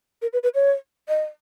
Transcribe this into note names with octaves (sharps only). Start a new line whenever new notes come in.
A#4
B4
B4
C#5
D#5